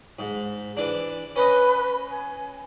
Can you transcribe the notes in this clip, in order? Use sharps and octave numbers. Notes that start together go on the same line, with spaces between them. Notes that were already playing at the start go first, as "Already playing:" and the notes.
G#2
E3 D4
C#4 B4 D#5
G#5